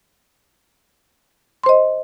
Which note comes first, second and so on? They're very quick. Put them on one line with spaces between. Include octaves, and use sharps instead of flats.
C6 C5 D#5